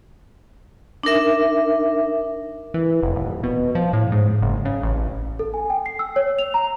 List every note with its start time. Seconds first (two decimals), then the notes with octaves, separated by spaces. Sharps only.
1.03 D4 D#4 A#4 E5
2.74 E3
3.03 F1
3.16 D#1
3.43 B2
3.75 F3
3.93 A2
4.12 G#2
4.41 F#1
4.65 C#3
4.83 A1
5.39 A4
5.54 G#5
5.70 G5
5.86 C7
5.99 E6
6.16 C#5
6.39 F7
6.54 A#5